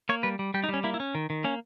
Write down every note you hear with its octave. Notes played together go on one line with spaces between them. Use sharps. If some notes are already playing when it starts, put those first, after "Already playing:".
A#3 C#5
G3 B4
G3
G3 G4
D#4
G3 C#4
A#3 E4
E4
C#4
D#3
D#3
A#3 C#4